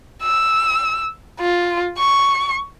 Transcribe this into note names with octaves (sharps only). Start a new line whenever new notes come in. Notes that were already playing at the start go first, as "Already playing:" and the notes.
E6
F4
C#6